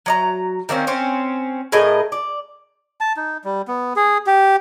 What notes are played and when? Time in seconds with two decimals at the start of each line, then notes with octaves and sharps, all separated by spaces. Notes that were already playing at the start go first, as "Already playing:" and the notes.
0.06 F#3 D5 A#5
0.69 D#3 A#3 C4 C#4
0.87 C4 C#4
1.72 A2 G#4 A#4 D#5
2.12 D5
3.01 A5
3.17 D#4
3.44 G3
3.68 B3
3.96 G#4
4.27 G4